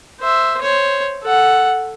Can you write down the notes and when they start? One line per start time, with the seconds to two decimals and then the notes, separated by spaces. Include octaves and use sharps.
0.20 C5 E5
0.62 C5 C#5
1.23 A4 F#5